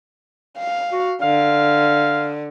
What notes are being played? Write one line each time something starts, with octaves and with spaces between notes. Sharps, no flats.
F5
F#4
D3 F5